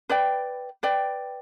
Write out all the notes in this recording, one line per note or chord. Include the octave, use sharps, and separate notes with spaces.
B4 D5 G5
B4 D5 G5